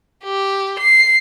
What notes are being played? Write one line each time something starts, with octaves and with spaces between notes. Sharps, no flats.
G4
C7